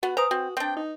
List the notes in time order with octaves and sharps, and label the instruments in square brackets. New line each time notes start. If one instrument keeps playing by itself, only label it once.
[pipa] B3 [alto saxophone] F#4
[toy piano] B4 G#5 D#6 [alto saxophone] C5 [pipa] A#5
[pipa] C4 [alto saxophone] F#4
[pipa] C4 D4 [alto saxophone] G5
[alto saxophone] D#4